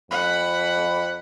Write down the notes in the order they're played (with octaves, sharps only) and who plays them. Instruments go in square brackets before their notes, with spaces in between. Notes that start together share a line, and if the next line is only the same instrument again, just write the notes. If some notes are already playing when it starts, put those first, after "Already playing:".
[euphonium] F2 [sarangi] F#5 [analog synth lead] B5